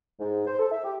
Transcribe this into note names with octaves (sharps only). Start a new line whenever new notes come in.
G#2
C5
A4
E5
G4